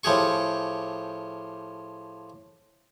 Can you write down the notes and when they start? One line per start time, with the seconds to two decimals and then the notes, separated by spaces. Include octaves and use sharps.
0.04 A2 F3 G4 G#4 C#6